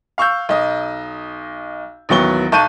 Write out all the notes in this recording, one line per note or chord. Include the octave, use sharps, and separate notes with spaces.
F5 C#6 E6 G6
B1 D#5
A1 D#2 F#3 B3 C#6 G7
B1 A5 C#6 F#6 G6 D#7